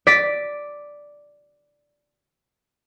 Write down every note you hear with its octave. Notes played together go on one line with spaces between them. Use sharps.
D5 B6